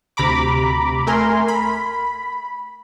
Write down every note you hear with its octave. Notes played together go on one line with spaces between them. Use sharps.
D2 C3 A#5 B5 D6
A3 A#4 G#5 A#5 C6
B5